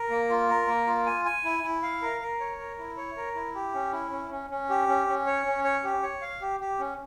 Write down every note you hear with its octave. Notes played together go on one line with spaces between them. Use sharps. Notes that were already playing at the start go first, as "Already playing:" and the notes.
Already playing: A#4
A#3
F4
A#4
A#3
F4
G#5
G#5
E4
E4
F5
A#4
A#4
C#5
A#4
E4
C#5
A#4
E4
G4
C#4
E4
C#4
C#4
C#4
G4
C#4
C#4
C#5
C#4
C#5
G4
C#5
F5
G4
G4
C#4